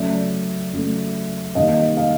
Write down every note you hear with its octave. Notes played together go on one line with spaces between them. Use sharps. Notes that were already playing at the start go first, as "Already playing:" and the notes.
Already playing: C#3 F#3 A3 D5 E5
C#3 F#3 A3
C3 D#3 G3 A#3 D#5 F5
D#5 F5